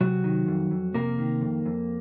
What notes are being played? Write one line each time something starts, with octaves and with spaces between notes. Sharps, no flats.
C3 F#3 F#4
D#3
F2
F2
C3 A#3 A#4
D#3
F2
F2